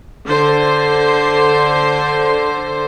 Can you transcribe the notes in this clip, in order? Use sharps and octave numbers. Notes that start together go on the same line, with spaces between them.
D3 C5